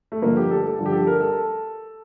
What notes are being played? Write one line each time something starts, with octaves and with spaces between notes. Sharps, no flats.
A3
G2 D3 F3 A#3
G4
A4
A4
G2 D3 F3
G4
A4
A#4
A4